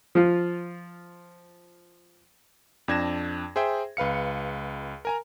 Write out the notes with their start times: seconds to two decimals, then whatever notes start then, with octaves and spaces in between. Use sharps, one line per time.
0.15 F3 F4
2.88 F2 D4 G#6 A#6 E7
3.56 G#4 C5 E5 G5
3.97 C#2 B4 F5 C#7
5.05 A#4 G#5 A#5